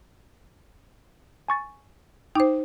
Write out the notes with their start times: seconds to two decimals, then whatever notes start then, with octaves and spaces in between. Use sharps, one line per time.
1.48 G#5 C#6 A6
2.35 D#4 C5 G5 D6